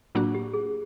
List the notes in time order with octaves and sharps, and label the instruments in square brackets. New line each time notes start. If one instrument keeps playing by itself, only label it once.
[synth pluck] A2 F#3 A#3 D4 F#4 [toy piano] F4
[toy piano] G4
G#4